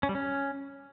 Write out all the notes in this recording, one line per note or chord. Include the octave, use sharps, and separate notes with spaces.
C#4
G3
C#4